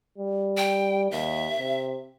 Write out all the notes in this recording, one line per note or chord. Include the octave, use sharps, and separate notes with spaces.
G3
G5
D#2 E5
C3